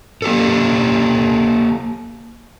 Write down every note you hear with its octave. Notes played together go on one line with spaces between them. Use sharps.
A#3 G4 A4